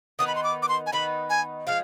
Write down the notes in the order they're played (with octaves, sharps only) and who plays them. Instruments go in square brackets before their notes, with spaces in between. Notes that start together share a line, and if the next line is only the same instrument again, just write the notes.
[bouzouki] D#3 B3 D#4 B4 [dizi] D#6
[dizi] B5
C6
D6
D6
C6
G#5
[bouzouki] D#3 B3 D#4 B4 [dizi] B5
[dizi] G#5
[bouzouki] F3 G#3 [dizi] F5